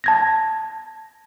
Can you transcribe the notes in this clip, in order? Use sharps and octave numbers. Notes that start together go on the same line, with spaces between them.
A5 G#6 A#6